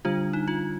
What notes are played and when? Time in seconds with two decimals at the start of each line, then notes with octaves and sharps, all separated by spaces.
0.05 D3 G3 D4 F4
0.33 D#4
0.48 F4